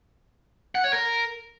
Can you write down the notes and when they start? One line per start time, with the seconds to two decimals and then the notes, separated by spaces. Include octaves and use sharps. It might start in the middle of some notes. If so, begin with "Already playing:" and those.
0.75 F#5
0.84 C#5
0.93 A#4